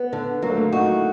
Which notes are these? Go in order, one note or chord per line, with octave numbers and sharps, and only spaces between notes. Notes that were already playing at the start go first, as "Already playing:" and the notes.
Already playing: B3
D3
F#3 A#3
A3
A#3
D#4 F#4
E4